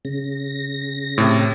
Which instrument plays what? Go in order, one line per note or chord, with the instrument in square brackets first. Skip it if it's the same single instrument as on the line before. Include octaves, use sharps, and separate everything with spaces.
[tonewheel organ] C#3 A#6
[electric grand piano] A2 C3